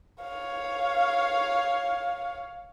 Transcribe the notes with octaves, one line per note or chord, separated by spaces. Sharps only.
C#5 F5